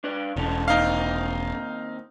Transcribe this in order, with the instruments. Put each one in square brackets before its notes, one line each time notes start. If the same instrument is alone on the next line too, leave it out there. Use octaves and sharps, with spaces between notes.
[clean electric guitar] D4 B4 D5
[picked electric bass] E1 [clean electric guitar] G#2 C#4 A4
[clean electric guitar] D#3 A#3 C4 [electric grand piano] D#4 F5